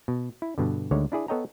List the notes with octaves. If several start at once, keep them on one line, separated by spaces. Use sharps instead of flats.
B2
E4
G2 B2 D3
D2 D3 D#3 G#3 C#5
D4 E4 G#4 D5
B3 A4 C#5 D#5 G5 A#5